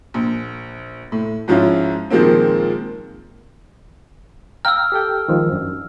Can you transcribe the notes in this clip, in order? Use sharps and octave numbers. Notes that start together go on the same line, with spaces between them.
A#1
A2
G#2 F3 C#4 E4 F4
A#2 D#3 F3 G#3 A#3 C4
F5 G5 A#5 E6 F6
G4 A4 G5
D#3 F3 G#3
F#2 D4